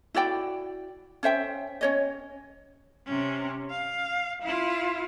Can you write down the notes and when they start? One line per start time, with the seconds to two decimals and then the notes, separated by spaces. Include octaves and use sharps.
0.14 E4 F#4 D5 G5
1.23 C#4 C5 E5 G5
1.81 C#4 C#5 D#5
3.06 C3 C#4
3.70 F5
4.42 E4 F4